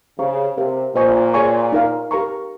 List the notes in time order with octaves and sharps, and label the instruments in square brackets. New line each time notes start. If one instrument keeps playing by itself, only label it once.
[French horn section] C#3 [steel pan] G4 C5 F5 A#5 C#6
[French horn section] C3 [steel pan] G4 A#4 F5
[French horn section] A#2 [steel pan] C5 D#5 G#5 C#6
[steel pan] G#4 C#5 G#5 C#6
D#4 A#4 F5
G4 A#4 F5 A#5 C#6